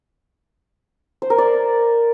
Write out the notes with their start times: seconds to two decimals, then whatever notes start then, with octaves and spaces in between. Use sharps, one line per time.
1.22 C5
1.30 A#4
1.38 D5